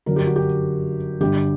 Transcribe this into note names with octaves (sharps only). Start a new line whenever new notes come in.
G1 F#2 D3 F#3 A#4
G4
F#4
G4
G1 G2 D3 G4